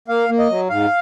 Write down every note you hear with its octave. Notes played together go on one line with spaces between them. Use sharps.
A#3 F5
A#3
D#5
F#3
G#2 F5